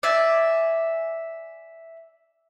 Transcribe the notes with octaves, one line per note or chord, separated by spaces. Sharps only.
D5 E5 G#5